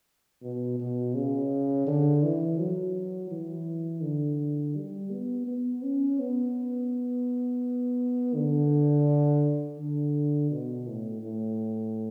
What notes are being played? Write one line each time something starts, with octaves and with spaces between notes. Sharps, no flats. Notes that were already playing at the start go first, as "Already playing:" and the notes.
B2
B2
C#3
D3
E3
F#3
E3
D3
G3
B3
B3
C#4
B3
D3
D3
B2
A2
A2